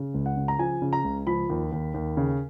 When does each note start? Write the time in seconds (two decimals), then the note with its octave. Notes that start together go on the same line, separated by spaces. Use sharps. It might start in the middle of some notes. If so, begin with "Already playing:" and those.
Already playing: C#3
0.14 C#2
0.26 F#5
0.37 C#3
0.48 A#5
0.59 F3 G#5
0.82 C#3
0.93 A#5
1.04 C#2
1.27 F3 B5
1.50 D#2
1.72 D#2
1.94 D#2
2.17 C#3